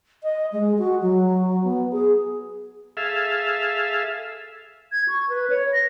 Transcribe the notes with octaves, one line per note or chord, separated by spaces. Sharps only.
D#5
G#3
F#4
F#3
B3
G#4
G#4 A4 E5 F5
G#6
C#6
B4
C#5
A#6